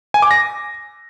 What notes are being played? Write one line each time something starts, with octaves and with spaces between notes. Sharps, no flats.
G#5
D6
A#6